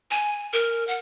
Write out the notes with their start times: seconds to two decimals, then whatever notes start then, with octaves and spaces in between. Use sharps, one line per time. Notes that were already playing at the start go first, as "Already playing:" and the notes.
0.11 G#5
0.53 A#4
0.88 F#5